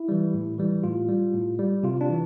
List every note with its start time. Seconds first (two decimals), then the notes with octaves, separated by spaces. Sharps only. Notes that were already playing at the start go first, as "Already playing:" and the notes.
Already playing: E4
0.08 E3 G3
0.34 A2
0.58 E3 G3
0.84 A2 F4
1.09 G3
1.34 A2
1.59 G3
1.83 C3 F4
2.01 D4
2.09 E3